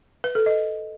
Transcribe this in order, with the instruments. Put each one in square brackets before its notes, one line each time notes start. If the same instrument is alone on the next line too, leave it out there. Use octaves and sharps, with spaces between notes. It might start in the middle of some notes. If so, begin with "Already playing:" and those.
[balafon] B4
A4
D#5